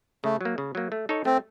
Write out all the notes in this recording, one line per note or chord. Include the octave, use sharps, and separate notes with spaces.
C#3 A3
F#3 A#3
C#3
F#3 A#3
A3
D#4 A4 C#5
A3 C4